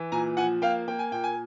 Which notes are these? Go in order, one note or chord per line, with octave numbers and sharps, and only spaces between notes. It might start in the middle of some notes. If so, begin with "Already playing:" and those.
Already playing: E3
A#2 G#5 A#5
F3 F#5 G#5
A#3 F5 G5
A#3 G5
G#5
A#2 G5
G#5